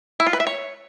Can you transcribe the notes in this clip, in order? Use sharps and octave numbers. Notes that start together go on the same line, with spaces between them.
E4
F4
B4
E5
C#5